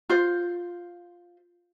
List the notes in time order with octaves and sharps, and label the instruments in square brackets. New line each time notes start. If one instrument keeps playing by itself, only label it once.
[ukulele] F4 C5